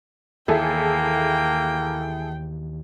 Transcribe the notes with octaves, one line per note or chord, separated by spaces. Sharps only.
D#2 E3 A#3 E4 G#4 A4 G5